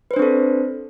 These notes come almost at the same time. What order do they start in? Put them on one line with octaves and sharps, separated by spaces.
B4 C5 D4 C4 A4